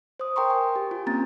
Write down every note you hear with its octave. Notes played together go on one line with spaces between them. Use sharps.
C5 D#6
A#4 G5 A#5 C6 C#6
G#5
G4
F4
A#3 C4 C#4 A#5 A6